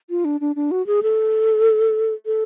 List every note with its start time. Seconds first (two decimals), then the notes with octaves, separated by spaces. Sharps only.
0.10 F4
0.25 D4
0.41 D4
0.56 D4
0.71 F#4
0.87 G#4
1.03 A4
2.26 A4